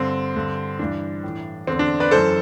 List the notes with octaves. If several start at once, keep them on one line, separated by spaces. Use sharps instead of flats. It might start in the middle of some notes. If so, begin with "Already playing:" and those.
Already playing: G2 D3 C4
G2 D3
G2 E3 D4
A2 E3
E2 D3 C4
D4
B4 D5
F#2 E3 A4 C5